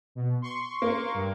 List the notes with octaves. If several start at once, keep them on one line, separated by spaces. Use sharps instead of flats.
B2
C6 C#6
A#3
G2